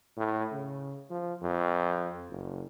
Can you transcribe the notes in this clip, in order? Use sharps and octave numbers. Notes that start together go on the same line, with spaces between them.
A2
C#3
F3
F2
F#1